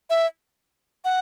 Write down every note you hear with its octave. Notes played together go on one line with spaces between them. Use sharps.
E5
F#5